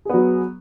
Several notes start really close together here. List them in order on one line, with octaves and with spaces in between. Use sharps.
G#4 B3 F#3